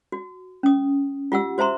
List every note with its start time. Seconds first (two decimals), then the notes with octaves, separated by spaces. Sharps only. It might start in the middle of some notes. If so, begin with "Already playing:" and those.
0.12 F#4
0.63 C#4 D#6
1.32 F4 G4 F#5 E6
1.58 F#4 C5 E5 A#5 C6